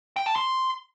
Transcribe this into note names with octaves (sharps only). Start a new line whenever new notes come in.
G5
A5
C6